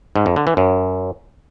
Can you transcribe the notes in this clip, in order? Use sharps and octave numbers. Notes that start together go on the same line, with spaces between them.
G#2
F2
D3
E3
F#2